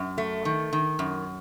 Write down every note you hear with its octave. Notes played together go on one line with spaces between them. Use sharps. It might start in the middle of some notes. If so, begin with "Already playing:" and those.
Already playing: F#2
A3
D#3
D#3
F#2